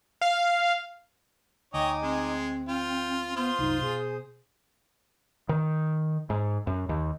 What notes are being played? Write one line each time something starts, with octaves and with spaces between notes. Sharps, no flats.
F5
D2 D#4 C#5 D#5 G5 G#5 D6
G#3 C4
F4 G5
B3 F4 C5 C6 D#6
C2 F#2 D#4
B2 G#4
D#3
G#2
F#2
D#2